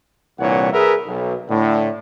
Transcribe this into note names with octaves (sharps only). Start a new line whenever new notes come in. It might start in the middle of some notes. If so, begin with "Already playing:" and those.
C2 G2 A#2 E3 C#5 F#5
G#4 A#4 B4 E5
B1
A2 D3